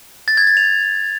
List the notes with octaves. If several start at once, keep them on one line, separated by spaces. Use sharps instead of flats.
A6
G#6
A6
F7